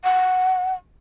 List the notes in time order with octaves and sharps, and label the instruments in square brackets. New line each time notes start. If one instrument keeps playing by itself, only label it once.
[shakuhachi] F#5